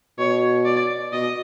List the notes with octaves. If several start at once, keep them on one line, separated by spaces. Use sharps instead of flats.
B2 C#5
D5
B2 D#5